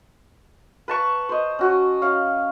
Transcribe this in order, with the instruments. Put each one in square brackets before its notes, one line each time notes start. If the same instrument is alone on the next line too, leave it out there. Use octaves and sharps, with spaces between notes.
[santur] B4 A5 C#6
C5 D#5
C#4 F#4
C#4 C#5 F5